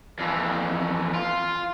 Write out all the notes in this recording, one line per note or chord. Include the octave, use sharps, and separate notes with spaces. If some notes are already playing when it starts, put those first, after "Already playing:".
F2 E3
F4